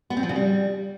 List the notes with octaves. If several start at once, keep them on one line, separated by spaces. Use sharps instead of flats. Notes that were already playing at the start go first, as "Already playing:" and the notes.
B3
C4
F3
C#3
G3